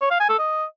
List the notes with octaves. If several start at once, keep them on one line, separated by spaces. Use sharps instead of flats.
C#5
F5
G#5
A4
D#5